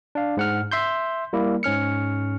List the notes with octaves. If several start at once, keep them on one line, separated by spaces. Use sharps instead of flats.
D4 F5
G#2 F#5 F6
E5 C6 G6
G3 A#3 E4
G#2 C#4 F6 C#7